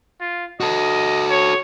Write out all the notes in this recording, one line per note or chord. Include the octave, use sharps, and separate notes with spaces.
F4
F#4 A4 D#5
C#5